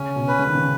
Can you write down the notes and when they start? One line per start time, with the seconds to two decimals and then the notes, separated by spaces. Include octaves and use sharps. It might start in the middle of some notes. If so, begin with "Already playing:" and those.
Already playing: C#3 C#4
0.16 B2
0.28 B4
0.39 C#3
0.47 D#3
0.55 C#3